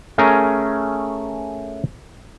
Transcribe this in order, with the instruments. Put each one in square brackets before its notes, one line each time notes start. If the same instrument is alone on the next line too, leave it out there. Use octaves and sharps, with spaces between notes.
[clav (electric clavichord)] A3 C#4 G#4 A#4 A#5